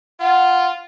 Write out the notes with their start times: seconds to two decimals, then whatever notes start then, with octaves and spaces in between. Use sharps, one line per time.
0.20 F4 F#5